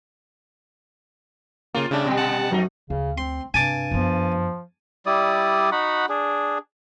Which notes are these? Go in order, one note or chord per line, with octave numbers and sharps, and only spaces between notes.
C#3 A#3 F4
C#3 G3 A3 D4
B2 G3
F#5 A5 F#6
F#2 F3 A3 D#4
D2 C#3
C4 C6
G2 C3 G#5 A5 D6
F#2 F3 B3
G3 E4 D5 D#6
D#4 F#4 F#5 B5
D4 G#4